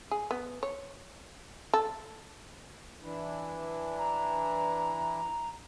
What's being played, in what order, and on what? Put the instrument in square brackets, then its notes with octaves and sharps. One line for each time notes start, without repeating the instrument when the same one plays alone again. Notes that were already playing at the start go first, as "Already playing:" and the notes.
[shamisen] G#4
B3
C#5
A4
[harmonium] E3 D4 E4
[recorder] A#5